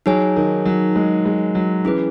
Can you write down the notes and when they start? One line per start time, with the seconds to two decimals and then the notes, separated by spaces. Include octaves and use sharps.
0.06 F#3 D#4 G#4 C#5 G#5
0.36 D#3
0.66 F#3
0.96 G#3
1.25 G#3
1.55 F#3
1.85 E3 C#4 G#4 B4